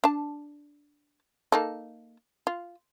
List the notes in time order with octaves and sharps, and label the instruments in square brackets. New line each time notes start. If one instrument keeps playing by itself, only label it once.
[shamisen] D4 A5
A#3 D#4 A4
F4